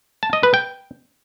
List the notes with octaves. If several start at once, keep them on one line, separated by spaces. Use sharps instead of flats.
A5
D#5
B4
G5